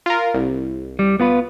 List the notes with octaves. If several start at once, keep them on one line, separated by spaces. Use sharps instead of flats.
F4 A#4
C2
G3
B3 F4 B4